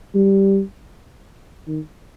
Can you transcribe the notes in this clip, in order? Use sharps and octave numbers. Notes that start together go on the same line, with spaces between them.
G3
D#3